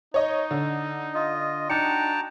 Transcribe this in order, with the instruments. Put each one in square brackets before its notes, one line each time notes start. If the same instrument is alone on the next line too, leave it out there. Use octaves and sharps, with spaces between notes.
[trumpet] D#4 [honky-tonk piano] C#5 D#5
[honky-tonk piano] D3
[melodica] F4 [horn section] D#5
[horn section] D4 D#4 [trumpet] F#4 [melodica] G5 A5 A#5 [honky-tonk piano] C#7